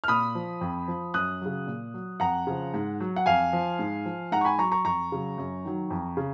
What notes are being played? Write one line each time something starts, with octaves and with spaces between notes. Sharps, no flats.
F6
A#2 B5 D#6
F3
F2
F3
F#2 D#6 F#6
C#3 F#3
A#2
F#3
F2 F#5 A#5
C#3 F3
G#2
F#3
F#5
F2 F5 G#5
F3
G#2
F3
G#2 F#5 A#5
C#6
G#5 B5
F#3 A#5 C#6
A#5 C#6
F2 A#5 C#6
C#3 F#3
F#2
D#3 F#3
F2
C#3